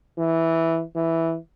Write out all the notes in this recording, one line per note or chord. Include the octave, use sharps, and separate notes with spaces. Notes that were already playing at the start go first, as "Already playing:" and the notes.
E3
E3